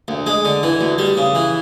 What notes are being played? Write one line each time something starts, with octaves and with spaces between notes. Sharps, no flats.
D2
G#3
D3
E3
D2
G3
C#3
E3